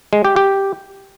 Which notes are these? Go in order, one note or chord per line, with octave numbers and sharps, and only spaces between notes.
G#3
G4
G4